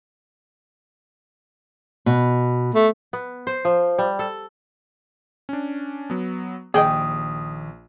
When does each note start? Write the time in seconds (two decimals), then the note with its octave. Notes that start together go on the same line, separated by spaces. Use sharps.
2.06 B2
2.74 A3
3.13 B3
3.47 C5
3.65 F3
3.98 G3
4.19 A4
5.49 C#4 D4
6.10 F#3 B3
6.74 A#1 D#2 G#4 D#5 G5 D#6